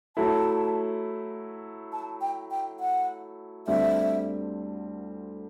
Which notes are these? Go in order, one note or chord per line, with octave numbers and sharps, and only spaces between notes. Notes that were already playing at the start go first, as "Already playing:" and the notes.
F#3 A3 E4 A5
A5
G5
G5
F#5
D2 D3 G3 C4 E5